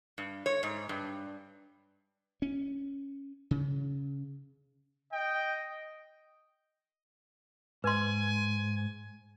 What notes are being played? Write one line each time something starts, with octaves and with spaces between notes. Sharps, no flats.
G2
C#5
G#2
G2
C#4
C#3
D#5 G5
G#2 B4 G#5 C6